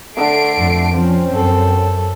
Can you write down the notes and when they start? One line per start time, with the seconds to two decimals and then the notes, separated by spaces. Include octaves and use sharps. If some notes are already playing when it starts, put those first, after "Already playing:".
0.17 D3 A3 C7 D7
0.59 F2
0.94 F3 C4 C#4
1.35 F#2 A4